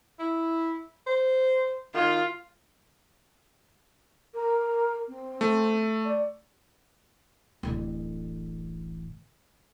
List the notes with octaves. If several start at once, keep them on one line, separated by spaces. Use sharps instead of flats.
E4
C5
D#3 F4
A#4
C4
A3
D5
D1 A1